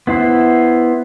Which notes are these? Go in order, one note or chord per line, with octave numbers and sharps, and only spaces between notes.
B3 E4 C5